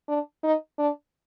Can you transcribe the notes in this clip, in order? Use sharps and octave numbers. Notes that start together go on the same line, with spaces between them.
D4
D#4
D4